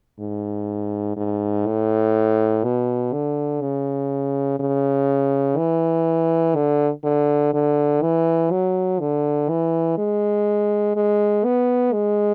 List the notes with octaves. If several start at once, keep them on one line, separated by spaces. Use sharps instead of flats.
G#2
G#2
A2
B2
D3
C#3
C#3
E3
D3
D3
D3
E3
F#3
D3
E3
G#3
G#3
B3
G#3